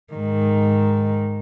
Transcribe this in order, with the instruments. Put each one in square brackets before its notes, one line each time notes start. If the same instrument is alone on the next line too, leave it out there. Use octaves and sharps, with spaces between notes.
[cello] G#2 D#3